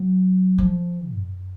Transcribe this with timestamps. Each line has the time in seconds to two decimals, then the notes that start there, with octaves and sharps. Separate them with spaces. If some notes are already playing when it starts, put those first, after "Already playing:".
Already playing: F#3
0.58 F3
1.13 F#2